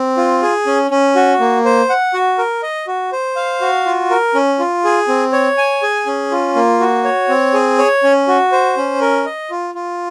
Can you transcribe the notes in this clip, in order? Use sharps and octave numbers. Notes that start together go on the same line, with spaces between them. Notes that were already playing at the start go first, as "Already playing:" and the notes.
Already playing: C4
F4
G#4
C#4
C#4
F#4
A#3
C5
F#5
F#4
A#4
D#5
F#4
C5
F5
F#4
F4
A#4
C#4
F4
G#4
C4
C#5
G#5
G#4
C#4
F4
A#3
F#4
C#5
C4
G#4
C#5
C#4
F#4
C5
C#4
A#4
D#5
F4
F4